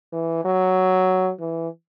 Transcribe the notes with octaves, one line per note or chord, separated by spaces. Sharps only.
E3
F#3
E3